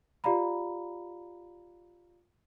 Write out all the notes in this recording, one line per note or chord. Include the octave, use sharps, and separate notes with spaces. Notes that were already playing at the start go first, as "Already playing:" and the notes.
F4 G4 D5 F5 A#5 B5